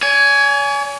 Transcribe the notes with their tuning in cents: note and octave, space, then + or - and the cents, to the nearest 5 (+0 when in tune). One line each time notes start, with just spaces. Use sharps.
C#5 +45 G#5 +10